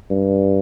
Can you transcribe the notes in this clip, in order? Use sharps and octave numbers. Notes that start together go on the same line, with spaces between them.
G2